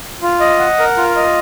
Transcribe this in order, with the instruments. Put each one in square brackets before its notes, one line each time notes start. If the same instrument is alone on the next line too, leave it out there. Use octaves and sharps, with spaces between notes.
[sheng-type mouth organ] F4
D#5
F#5
A#4
F4
D#5